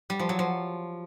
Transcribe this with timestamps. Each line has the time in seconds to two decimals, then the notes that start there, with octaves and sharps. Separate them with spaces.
0.10 G3
0.19 F3
0.29 F#3
0.39 F3